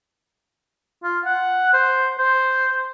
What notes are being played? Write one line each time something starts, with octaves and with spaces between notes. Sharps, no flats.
F4
F#5
C5
C5